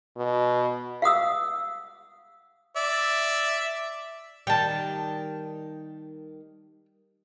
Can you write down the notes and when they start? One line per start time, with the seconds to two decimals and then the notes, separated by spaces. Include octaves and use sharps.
0.17 B2
1.02 F5 F#5 D#6 E6
2.77 D5 E5
4.47 D#3 G3 G5 A5